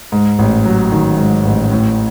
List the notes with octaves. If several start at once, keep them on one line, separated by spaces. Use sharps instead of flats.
G#2
A1
F#3
D#3
G#2
A1
A2